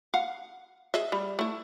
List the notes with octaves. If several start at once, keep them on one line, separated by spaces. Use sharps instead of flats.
F5 F#5
G#4 D#5 E5
G3
A3 E4